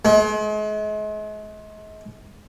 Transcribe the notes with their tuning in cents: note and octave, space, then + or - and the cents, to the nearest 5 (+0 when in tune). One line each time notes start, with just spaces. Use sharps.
G#3 +40